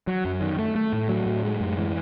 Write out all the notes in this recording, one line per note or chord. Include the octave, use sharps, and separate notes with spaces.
F#3
F#2
D#3
A3
A3
A2
F#3
A2
G#3
F#2
E3